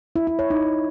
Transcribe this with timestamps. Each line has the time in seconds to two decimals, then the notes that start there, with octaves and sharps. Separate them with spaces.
0.16 E4
0.27 E4
0.39 C#5
0.50 D#4